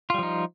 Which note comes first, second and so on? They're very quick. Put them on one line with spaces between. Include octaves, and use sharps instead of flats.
F4 G3 F3 D#4